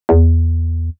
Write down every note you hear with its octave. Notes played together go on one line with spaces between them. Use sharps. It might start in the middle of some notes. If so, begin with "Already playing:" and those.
E2